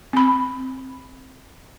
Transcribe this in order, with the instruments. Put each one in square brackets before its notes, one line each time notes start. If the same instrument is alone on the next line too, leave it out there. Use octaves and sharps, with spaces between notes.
[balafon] C4 B5